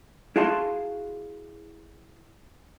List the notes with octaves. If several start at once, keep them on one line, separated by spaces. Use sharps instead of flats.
E4 F#4 G#4 F5 A5 C6